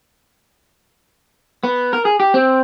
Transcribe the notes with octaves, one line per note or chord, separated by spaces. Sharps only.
B3
A#4
G#4
G4
C4